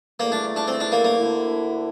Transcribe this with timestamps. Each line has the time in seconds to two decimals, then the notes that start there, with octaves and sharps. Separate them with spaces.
0.20 E2 D3 A3 A#3 E4
0.32 D4
0.56 D4
0.68 C4
0.80 D4
0.92 A#3
1.04 A#3
1.16 D2 D3 A3 E4